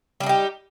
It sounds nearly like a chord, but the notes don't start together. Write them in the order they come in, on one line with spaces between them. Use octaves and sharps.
G3 D4 D#4 G4